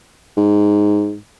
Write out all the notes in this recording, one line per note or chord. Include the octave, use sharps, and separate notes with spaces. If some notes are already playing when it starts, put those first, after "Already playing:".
G#2